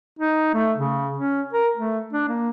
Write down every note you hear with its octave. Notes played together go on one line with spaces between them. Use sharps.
D#4
A3
C#3
C#4
A#4
A3
D4
A#3